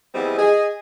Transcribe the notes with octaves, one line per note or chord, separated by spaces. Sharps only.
E3 G3 B3 C4 G#4 D#5
G#4 D#5